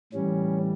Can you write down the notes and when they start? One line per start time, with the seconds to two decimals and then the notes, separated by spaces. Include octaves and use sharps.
0.13 A2 E3 G3 C#4